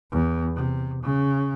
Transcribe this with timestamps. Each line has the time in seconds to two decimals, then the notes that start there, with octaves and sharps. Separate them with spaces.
0.12 E2
0.56 C3
1.03 C#3